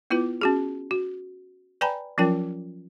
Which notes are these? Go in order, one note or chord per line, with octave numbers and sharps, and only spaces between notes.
B3 E4 F4 B4
C#4 F#4 G#4
F#4
B4 D5 G5 G#5 A#5 B5
F3 F#3 C#4 F4 A#4 G5